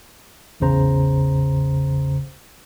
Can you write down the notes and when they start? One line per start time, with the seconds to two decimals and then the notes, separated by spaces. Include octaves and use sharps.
0.60 A1 E2 C#3 C5 A#5